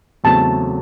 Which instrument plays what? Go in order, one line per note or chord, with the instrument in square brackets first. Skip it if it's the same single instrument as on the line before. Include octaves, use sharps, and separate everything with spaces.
[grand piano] E2 C#3 F#3 A3 C4 [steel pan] A5